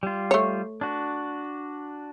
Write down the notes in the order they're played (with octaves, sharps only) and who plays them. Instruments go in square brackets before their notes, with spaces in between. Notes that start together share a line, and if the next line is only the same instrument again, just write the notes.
[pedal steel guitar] G3 F4
[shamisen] A3 C#5
[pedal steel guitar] D4 F#4